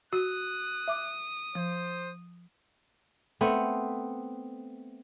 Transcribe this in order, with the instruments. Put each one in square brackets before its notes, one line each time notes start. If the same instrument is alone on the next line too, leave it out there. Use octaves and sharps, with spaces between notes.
[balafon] F#4 [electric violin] D#6 [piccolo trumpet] F#6
[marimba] E5 D6
[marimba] F3 [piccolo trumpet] C5
[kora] A3 B3 C4